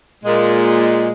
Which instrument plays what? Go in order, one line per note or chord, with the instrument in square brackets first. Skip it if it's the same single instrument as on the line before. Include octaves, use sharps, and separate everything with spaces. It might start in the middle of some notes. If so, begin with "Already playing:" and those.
[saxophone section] A#2 G#3